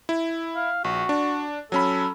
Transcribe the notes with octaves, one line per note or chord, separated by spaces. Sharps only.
E4
F5
A#1 F#4
D4
F#3 C#4 A4 B5